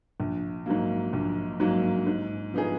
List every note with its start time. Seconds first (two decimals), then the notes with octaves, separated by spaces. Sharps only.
0.20 A#1
0.66 G#2 F#3 A#3
1.13 A#1
1.60 G#2 F#3 A#3
2.07 G#2
2.54 F3 B3 D#4 G#4